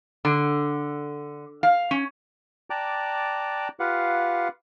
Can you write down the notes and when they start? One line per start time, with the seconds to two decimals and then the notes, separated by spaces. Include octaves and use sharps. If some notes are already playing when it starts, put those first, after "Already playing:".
0.25 D3
1.63 F5
1.91 C#4
2.70 D5 G5 A5 A#5 D6 F#6
3.80 F4 G4 B4 F5 F#5